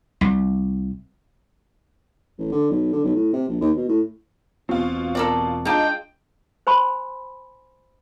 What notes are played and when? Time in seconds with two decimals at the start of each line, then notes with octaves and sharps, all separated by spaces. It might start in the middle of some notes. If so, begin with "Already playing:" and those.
0.21 C2
2.38 A1
2.52 D3
2.70 B1
2.93 D3
3.04 B1
3.15 A2
3.33 C3
3.49 A#1
3.61 D#2
3.77 B2
3.89 A2
4.69 E1 B2 C4 F4
5.15 A4 A#4 D5
5.65 G#3 D4 D#4 F4 G5
6.67 C5 G#5 B5 C6